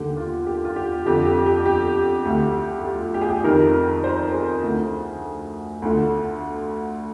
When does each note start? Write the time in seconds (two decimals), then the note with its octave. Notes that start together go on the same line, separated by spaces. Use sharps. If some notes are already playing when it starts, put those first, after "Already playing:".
Already playing: D#2 D3 G4
0.17 F4
0.46 G4
0.65 F4
0.76 G4
1.06 F2 D3 G4
1.25 G4
1.46 G4
1.66 G4
2.25 D2 D3
2.78 G4
2.85 F4
3.14 G4
3.21 G#4
3.29 G4
3.44 F2 D#3 A#4
4.04 C5
4.33 G#4
4.63 D2 D3
5.82 D2 D3